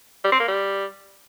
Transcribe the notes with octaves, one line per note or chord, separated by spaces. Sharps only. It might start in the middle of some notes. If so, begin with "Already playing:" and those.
G3
C4
A#3
G3